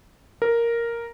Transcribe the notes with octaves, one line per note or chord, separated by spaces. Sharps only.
A#4